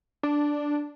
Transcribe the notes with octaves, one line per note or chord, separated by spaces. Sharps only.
D4